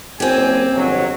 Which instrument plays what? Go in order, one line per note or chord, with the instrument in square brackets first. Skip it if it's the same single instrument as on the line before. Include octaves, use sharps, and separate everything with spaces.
[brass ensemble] F#1 G#5 [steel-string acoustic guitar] C4 G4
[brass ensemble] G1 F2 F#3